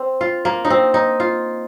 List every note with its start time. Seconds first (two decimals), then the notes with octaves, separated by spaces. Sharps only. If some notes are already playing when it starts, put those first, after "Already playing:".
Already playing: C4
0.21 F4
0.45 A#3
0.65 D#4
0.70 C4
0.94 D#4
1.20 F4